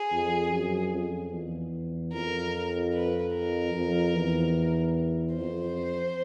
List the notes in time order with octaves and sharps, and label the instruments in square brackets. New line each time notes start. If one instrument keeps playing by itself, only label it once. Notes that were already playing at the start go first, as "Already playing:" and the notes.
Already playing: [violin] G#4
[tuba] F2
F#2
F2
E2
[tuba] F2 [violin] A#4
[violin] B4
A#4
[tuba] F2
E2
[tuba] F2 [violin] C5